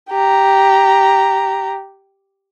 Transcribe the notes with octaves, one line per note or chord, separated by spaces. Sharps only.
G4 A#5